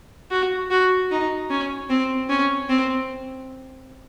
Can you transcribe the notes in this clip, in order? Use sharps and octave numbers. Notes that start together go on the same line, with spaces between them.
F#4
F#4
D#4
C#4
C4
C#4
C4